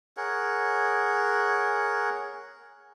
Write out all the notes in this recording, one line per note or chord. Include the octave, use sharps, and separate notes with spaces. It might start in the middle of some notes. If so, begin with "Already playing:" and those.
G#4 A#4 C#5 F#5